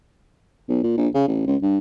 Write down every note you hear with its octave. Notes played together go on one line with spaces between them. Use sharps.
B1
A#2
A#1
C#3
A1
C#2
G2